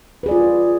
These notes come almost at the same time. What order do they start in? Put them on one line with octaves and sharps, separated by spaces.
B4 G#4 D5 F4